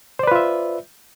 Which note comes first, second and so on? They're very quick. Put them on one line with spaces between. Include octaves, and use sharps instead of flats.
C5 D5 B4 F4 E5